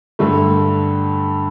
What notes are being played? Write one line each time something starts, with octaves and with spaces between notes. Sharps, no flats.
G2 D3 A3